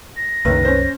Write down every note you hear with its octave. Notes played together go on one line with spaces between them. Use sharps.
A#6
F#1 C2 F#2 D#3 B4
C#4 C5